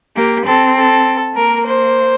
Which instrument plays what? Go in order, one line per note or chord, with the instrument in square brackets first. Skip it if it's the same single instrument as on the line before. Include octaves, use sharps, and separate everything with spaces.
[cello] A#3 [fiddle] G4
[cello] C4 [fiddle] A4
[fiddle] A4
[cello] A#3 [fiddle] A#4
[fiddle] C5